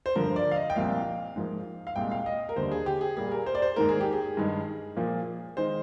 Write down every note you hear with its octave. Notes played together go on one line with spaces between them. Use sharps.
C5
G2 D3 F3 A#4
D5
F5
D#5
G5
C2 A#2 F3 A#3 F5
G#2 F3 A#3
F5
C2 A#2 G#3 G5
F5
D#5
A#4
D#2 D3 G3 C5
G#4
G4
G#4
A#2 G3 A#3 G#4
A#4
C5
D5
C5
G#2 D#3 A#3 A#4
G#4
G4
G#4
G2 D#3 G#3
A#2 F3 A#3
D#3 G#3 C5